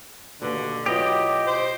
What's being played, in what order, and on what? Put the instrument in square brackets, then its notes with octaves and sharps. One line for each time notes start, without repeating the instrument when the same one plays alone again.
[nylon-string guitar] D#2 B2 [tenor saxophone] D3
[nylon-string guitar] B2 E4 F4 [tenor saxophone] F#3 [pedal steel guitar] G4 D#5
[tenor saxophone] C5